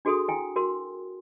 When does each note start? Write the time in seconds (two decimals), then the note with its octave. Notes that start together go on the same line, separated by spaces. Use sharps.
0.05 D4 F#4 G#4 A4 C6 D#6
0.28 E4 G5 G#5
0.56 F#4 A#4 C6